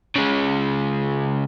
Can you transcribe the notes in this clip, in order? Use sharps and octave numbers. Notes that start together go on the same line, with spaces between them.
C#3 G#3